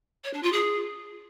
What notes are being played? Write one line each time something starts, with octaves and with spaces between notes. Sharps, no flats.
C#5
D4
F4
G#4